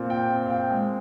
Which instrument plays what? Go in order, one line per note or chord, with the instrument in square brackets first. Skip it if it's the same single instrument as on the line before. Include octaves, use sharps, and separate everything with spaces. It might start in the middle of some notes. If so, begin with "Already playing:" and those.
Already playing: [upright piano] A#2 C4
G5
C4
F5
G5
G#3